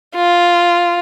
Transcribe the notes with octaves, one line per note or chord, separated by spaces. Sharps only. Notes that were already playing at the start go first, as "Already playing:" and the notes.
F4